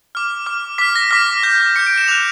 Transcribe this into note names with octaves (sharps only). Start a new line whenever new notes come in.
D6 F6
D6 F6
D6 F6 B6
A#6
D6 F6 B6
D6 G6
D6 G6 C#7
D7
E7
D6 F#6 F7